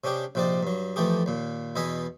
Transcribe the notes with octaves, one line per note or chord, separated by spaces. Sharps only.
C3 C#4 D4 G4 G#4
A#1 C3 C4 D#4 D5
G2 F#3
F2 E3 A3 G4 G#4
D#2 A#2
E2 B2 B3 D#5 E5 G#5